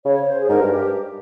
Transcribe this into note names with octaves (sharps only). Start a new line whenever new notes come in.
C#3 C#5
C#5
C5
G#4
G#2 A#4
G2
G4